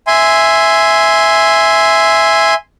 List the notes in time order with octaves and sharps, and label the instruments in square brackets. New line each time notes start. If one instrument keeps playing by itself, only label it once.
[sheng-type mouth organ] E5 G#5 C6